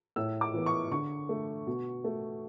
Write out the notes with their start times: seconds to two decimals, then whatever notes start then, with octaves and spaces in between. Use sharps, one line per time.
0.16 A2 E6
0.41 D6
0.54 E3 B3
0.66 C#6
0.91 D3 C#6
1.29 A3
1.67 B2
2.04 A3